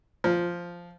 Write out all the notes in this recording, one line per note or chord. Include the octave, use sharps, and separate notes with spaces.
F3